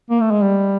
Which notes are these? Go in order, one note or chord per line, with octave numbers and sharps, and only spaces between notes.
A#3
A3
G#3
G3